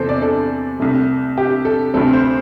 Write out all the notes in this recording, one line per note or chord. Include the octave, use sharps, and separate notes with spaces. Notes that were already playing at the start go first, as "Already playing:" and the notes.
Already playing: E2 C3 E3 A4 C5
D5
A4
C2 C3 A3
G4
A4
D2 C3 A3 C4 A4
C5